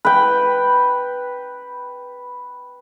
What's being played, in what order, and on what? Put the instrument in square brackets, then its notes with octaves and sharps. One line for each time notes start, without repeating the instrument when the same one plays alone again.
[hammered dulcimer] B4 G5